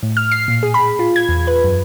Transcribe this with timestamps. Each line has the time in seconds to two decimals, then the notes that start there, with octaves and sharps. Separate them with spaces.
0.03 A2
0.17 F6
0.32 C7
0.48 A#2
0.63 G#4
0.74 B5
0.99 F4
1.16 G#6
1.29 E2
1.47 B4
1.64 F#2